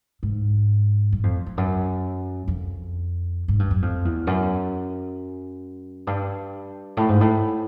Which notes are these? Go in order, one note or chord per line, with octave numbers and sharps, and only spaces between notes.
G#2
G2
F2
F2
F#2
F2
G#2
G2
F#2
F2
E2
F#2
G2
A2
G#2
A2